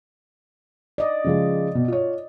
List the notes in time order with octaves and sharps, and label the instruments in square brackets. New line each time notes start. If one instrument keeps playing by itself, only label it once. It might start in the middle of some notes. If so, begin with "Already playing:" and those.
[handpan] D5 D#5
[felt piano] C#3 F3 G#3
B2
F4 C#5